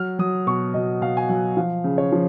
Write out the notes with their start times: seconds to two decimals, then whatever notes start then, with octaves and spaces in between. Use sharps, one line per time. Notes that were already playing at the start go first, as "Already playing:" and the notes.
Already playing: F#3 F6
0.19 F#3 D#6
0.47 B2 C#6
0.74 B2 D#5
1.01 B2 F5
1.17 G#5
1.29 F#3 F#5
1.57 F3 F5
1.84 C#3
1.98 C#5
2.12 F3